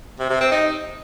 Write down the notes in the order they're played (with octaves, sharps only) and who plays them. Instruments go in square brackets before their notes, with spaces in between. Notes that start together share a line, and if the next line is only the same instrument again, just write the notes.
[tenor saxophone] C3
C3
C4
D#4